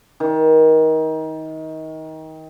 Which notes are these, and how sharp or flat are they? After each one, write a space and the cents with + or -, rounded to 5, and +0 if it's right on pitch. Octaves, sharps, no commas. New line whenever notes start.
D#3 +25